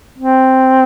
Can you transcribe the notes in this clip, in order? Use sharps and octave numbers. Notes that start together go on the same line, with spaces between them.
C4